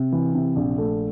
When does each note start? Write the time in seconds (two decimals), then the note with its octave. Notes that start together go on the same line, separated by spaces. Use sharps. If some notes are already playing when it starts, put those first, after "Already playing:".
Already playing: C3
0.12 E3
0.35 C3
0.56 A#1
0.78 A3